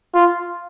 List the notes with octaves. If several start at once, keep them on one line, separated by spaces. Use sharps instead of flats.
F4